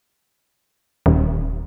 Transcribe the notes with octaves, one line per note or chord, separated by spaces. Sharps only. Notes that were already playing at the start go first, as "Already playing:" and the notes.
D#1